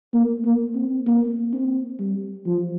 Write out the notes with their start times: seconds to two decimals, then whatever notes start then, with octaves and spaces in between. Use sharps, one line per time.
0.14 A#3
0.45 A#3
0.76 C4
1.06 A#3
1.53 C4
1.99 G3
2.46 F3